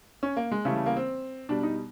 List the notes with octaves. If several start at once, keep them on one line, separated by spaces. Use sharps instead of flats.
C#4
A#3
G#3
C#3 E3 G3 A3
A3
A#3
C4
B2 G3 D4
D#4